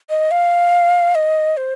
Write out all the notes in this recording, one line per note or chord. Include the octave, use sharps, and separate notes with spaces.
D#5
F5
D#5
C5